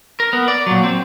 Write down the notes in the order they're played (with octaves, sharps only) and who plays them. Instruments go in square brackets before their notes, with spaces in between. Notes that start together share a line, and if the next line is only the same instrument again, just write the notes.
[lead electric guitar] A#4
B3
D5
A#2 F#3
C4